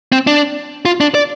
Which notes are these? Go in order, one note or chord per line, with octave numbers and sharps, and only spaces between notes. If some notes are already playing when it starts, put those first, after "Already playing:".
C4
D4
F4
D4
D5